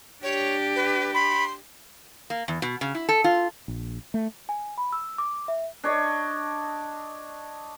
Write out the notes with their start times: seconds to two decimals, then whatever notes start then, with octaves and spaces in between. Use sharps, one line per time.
0.23 D4 G4 C#5
0.76 B4
1.14 B5 C6
2.30 A#3
2.48 E2
2.62 B2
2.81 C#3
2.95 E4
3.09 A4
3.24 F4
3.68 A#1
4.14 A3
4.49 G#5
4.78 B5
4.93 E6
5.18 D6
5.48 E5
5.84 D4 C#5 D#5